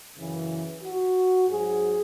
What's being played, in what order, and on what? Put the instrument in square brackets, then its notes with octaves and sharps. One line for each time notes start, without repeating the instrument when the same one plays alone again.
[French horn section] F#2 C#3 E3
F#4
G#2 F#3 G#4